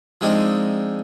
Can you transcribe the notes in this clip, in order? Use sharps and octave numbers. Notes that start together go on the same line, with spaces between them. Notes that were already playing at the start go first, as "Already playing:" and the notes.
F3 G#3 C4 D4 D#4